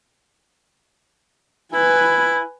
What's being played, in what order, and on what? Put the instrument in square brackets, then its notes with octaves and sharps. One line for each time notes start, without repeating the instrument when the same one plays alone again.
[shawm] E4 [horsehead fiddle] B4 G#5